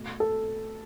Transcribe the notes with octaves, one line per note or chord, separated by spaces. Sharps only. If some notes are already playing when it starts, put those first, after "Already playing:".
Already playing: B2 A3
A4